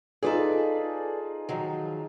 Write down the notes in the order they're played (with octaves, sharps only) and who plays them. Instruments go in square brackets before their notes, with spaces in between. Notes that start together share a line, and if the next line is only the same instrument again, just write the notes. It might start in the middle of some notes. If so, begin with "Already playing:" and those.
[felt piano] D#4 F4 G#4 [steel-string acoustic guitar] A4 B4 D5
[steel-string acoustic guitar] D#3 F3 F#3